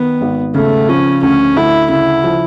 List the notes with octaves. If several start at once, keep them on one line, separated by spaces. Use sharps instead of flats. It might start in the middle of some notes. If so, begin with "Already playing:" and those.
Already playing: D#3 B3
G#1
C#3 A3
F3 C#4
D2 C#4
D2 E4
C#3 E4
F3